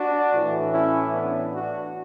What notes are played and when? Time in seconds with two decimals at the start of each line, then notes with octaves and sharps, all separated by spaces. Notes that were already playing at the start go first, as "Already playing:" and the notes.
Already playing: D4 F#4
0.31 A2 E3
0.72 C#4 E4
1.13 B3 D4
1.54 D4 F#4